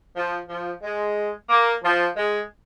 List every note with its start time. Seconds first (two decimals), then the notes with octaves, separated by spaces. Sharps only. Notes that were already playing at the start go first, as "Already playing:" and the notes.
0.15 F3
0.49 F3
0.83 G#3
1.49 A#3
1.83 F3
2.17 G#3